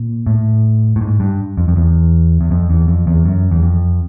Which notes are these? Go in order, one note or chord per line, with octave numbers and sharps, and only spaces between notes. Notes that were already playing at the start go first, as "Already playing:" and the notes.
Already playing: A#2
A2
A2
G#2
G2
F2
F2
E2
E2
F2
E2
F2
E2
F#2
E2
F2